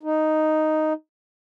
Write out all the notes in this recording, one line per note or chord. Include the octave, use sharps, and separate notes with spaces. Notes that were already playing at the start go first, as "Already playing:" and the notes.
D#4